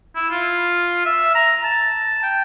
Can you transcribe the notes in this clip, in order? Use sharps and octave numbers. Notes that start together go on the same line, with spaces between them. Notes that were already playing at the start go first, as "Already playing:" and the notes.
E4
F4
E5
A#5
A5
G5